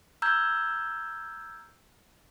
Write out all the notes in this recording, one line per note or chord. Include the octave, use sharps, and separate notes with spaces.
A#5 E6 F6 G6 G#6